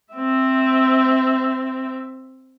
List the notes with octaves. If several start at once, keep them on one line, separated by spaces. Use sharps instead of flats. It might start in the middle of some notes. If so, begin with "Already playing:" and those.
C4 E5